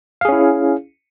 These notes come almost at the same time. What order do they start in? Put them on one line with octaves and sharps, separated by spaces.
F5 G#4 C#4 E4